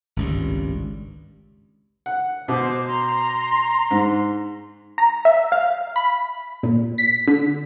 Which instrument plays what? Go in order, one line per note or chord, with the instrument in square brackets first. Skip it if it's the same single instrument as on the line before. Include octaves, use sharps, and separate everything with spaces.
[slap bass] G#1 C#2 G2
[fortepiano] F#5
[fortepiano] B2 [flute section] C5 D6
[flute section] A#5 C6
[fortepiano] G#2
[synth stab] A#5
E5
F5
B5
A#2
B6
D3